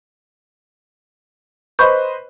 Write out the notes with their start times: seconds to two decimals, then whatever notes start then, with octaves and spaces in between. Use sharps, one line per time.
1.79 B4 C5 D#5 B5 C#6 G6